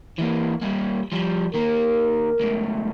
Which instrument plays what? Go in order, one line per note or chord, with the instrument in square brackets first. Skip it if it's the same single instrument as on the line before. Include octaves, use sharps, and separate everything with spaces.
[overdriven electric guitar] E3 A#3
G3 A#3
F3 G3
[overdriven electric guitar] D#3 A#3 [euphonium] A#4
[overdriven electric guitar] C#2 A2